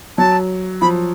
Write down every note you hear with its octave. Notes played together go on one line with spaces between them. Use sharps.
F#3 A5
F3 B5